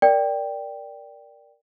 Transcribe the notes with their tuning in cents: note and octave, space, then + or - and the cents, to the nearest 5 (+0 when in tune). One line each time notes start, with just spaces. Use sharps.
A#4 +0 D5 +0 G5 +0